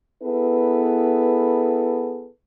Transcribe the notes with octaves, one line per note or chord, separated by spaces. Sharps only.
B3 E4 G#4 A4 B4